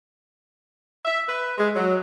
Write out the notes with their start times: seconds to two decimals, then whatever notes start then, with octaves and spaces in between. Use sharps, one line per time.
1.05 E5
1.28 B4
1.58 G#3
1.76 F#3